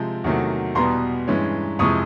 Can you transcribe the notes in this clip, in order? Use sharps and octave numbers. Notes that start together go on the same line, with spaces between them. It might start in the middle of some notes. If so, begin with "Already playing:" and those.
Already playing: C3 F3 G#3 C4
E2 C3 D#3 F#3 A3
E2 B2 G3 B3 A#5 C6
G2 E3 G#3 C#4
F2 C3 E3 G#3 C#6 D#6